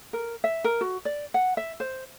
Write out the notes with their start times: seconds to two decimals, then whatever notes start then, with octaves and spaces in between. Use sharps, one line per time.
0.13 A#4
0.44 E5
0.64 A#4
0.81 F#4
1.05 D5
1.34 F#5
1.57 E5
1.80 C5